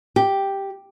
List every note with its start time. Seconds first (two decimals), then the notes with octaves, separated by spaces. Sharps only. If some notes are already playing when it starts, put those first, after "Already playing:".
0.16 G4